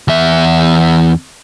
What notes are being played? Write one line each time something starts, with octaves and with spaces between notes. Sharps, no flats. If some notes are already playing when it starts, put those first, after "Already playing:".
E2 E5